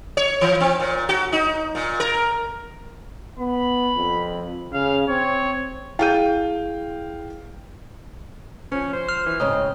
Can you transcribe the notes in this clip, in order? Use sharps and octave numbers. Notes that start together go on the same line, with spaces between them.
C#5
E3
C4
A#2
F#4
D#4
A#2
A#4
B3 B5
F2
C#3 F5
C4 C#5
E4 G#4 F5 G5 G6 D#7
F3 C#4
C5
F6
E3
G#2 C#3 C4 D#5